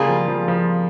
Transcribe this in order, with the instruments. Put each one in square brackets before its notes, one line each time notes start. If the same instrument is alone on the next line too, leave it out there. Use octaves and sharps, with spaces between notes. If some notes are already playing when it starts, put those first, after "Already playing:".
Already playing: [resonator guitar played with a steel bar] C#3 G3 A#3 F4 G#4
[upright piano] F3
F3
F3